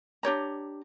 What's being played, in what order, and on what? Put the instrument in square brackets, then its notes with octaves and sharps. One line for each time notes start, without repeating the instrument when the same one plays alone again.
[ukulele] D4 G4 C#5 A#5